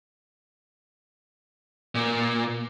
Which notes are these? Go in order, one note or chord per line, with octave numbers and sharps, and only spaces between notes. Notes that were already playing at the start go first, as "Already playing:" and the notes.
A#2